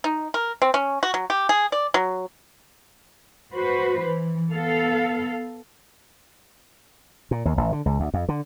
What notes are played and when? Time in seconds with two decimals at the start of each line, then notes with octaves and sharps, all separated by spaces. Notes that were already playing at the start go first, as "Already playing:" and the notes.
0.04 D#4
0.34 A#4
0.62 C4
0.74 C#4
1.03 F#4
1.14 F#3
1.30 G4
1.49 G#4
1.72 D5
1.94 F#3
3.53 F#4 B4 C5
4.01 E3
4.52 B3 A4 F5
7.31 A#2
7.45 D#2
7.57 A1
7.72 D3
7.86 C#2
8.00 D2
8.14 F2
8.29 D3